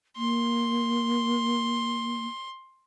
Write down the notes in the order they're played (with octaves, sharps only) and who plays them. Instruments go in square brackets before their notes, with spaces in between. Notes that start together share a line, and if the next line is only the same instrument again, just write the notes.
[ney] A#3 [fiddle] C6